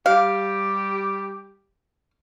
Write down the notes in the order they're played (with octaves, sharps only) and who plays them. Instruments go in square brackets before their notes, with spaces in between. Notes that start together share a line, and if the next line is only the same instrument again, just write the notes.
[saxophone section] G3 G4 [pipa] F5